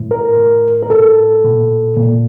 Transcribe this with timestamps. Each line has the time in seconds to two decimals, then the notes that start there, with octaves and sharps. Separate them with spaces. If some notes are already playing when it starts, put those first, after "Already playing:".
Already playing: A2
0.11 A#4
0.37 A2
0.83 A#4
0.90 A2 A4
1.44 A#2
1.97 A#2